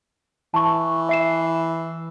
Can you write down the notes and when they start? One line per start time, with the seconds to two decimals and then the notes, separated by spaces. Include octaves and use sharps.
0.54 E3 A5 C#6
1.09 E5 C7 E7